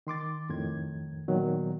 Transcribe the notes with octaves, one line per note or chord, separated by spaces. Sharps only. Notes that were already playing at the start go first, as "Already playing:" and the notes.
D#3 C6 D6 A6
F2 A2 D#3 G#6
A#2 D#3 F#3 B3